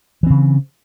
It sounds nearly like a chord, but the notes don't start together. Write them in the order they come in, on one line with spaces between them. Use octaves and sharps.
E3 C4 C#3